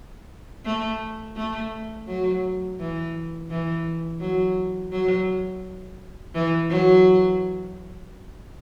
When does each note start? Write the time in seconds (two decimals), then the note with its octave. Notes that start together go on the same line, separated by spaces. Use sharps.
0.65 A3
1.36 A3
2.07 F#3
2.79 E3
3.50 E3
4.21 F#3
4.92 F#3
6.35 E3
6.70 F#3